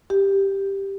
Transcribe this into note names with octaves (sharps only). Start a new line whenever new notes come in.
G4